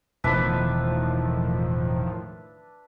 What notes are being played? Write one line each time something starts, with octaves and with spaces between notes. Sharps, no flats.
E1 A2 D#3 F3 D4 B4 E5